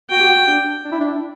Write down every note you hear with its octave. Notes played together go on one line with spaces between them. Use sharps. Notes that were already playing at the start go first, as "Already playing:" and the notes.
F#4 G5
G4
F#4
D4
D4
E4
D4